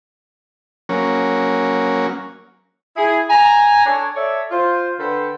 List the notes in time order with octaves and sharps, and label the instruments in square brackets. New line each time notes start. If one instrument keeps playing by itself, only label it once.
[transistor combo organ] F#3 A#3 C#4
[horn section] E4 G#4
G#5 A#5
D4 A4 C#5
A4 C#5 D5 E5
F4 C5
D3 A4 B4 F#5 G5 C6